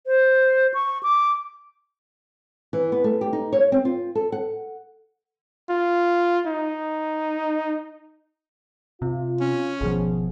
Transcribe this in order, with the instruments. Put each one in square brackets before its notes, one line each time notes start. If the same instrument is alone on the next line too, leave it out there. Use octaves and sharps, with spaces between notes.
[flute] C5
C#6
D6
[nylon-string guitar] E3
B3
A3
G4
D#4
C#5
C4
F4
A4
F#5
[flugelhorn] F4
D#4
[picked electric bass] C3 [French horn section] F4
[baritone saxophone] C#4
[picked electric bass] G#1 B2 F3 [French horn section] G#4